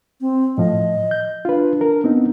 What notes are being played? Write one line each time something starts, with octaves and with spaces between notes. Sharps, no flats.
C4
A2 F3 D#5
G6
D4 F4 B4
A#4
B3 C4 D#4